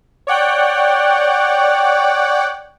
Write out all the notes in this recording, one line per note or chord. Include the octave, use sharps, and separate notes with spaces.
C#5 D5 F#5 G5